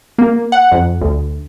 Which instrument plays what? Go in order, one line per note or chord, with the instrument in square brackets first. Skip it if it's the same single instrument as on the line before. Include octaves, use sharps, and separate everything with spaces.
[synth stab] A#3
F#5
F2
D2